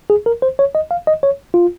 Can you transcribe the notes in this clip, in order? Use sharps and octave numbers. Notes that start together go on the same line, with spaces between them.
G#4
A#4
C5
C#5
D#5
F5
D#5
C#5
F4